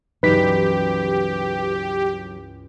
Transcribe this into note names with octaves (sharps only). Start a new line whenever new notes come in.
C#2 G2 E3 F#3 D#4 G4 B4 B6